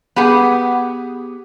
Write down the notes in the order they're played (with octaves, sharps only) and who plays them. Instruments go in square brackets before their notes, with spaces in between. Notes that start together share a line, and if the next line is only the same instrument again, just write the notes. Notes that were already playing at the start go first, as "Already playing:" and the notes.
[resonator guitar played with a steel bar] B3 G4 G#4 F#5